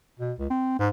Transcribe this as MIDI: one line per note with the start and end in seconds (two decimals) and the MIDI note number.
0.19 0.33 47
0.39 0.49 37
0.50 0.76 60
0.79 0.89 44